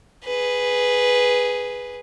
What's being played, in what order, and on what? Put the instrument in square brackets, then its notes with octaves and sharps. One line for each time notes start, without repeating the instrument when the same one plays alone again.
[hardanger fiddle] G#4 B4